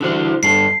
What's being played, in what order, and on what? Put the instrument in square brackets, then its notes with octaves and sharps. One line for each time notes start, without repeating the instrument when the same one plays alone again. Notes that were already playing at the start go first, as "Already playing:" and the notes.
[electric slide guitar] D3 F#4 C5 [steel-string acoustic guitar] E3 G3
[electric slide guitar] G2 G#4 A4 [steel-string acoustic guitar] D4 [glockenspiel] C7